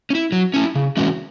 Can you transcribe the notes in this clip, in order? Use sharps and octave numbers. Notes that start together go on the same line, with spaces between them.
C#4
E4
F#3
C#4 E4
C#3
E3 G#3 C#4 F#4